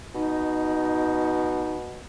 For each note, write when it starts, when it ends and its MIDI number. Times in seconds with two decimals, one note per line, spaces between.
0.15 2.04 47
0.15 1.73 63